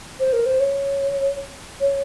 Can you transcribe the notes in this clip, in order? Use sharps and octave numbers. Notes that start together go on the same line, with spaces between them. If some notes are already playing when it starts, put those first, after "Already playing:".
C5
A#4
C5
C#5
C#5